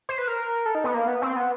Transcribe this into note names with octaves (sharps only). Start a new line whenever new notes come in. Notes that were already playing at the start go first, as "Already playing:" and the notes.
C5
B4
A#4
A4
D#4
B3
A#3
B3
C4
B3